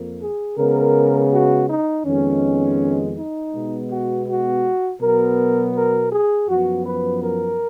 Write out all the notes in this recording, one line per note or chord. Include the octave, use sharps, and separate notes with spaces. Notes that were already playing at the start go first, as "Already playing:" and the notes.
Already playing: F2 F3 A#3
G#4
C#3 G#3 B3 A#4
F#4
D#4
F2 D#3 G#3 B3 C#4
D#4
B2 G#3 B3
F#4
F#4
B2 F#3 B3 A#4
A#4
G#4
F#2 F3 B3 F#4
B4
A#4